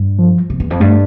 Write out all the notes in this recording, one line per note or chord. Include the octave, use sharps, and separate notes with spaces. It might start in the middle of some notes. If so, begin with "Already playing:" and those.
Already playing: G2
F3
C3
E2
F2
G2 A3